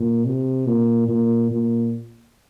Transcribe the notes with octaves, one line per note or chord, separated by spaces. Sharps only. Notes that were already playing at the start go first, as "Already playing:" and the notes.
Already playing: A#2
C3
A#2
A#2
A#2